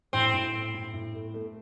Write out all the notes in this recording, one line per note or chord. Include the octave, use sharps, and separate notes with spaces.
A2 C4
A2
A2
A2
A2
A3
A3